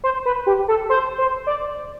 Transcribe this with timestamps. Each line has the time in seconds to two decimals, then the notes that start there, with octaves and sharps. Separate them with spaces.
0.04 C5
0.26 B4
0.46 G4
0.68 A4
0.90 C5
1.18 C5
1.47 D5